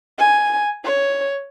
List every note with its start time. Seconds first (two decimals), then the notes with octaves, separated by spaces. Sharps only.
0.19 G#5
0.84 C#5